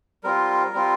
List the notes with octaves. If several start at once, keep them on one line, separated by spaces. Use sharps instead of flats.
G3 C4 F4 A#4
G3 C4 F4